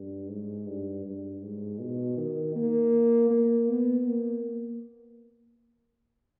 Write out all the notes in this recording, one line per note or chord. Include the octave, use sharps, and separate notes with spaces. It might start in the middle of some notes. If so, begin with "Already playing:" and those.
Already playing: G2
G#2
G2
G2
G#2
B2
D#3
A#3
A#3
B3
A#3